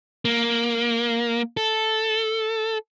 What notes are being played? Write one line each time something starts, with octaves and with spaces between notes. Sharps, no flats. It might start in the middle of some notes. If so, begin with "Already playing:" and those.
A#3
A4